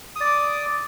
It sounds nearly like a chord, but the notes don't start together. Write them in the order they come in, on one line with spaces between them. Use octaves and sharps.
D#6 D5 D6